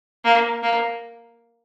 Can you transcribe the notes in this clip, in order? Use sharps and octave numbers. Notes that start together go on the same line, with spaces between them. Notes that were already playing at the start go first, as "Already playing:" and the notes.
A#3
A#3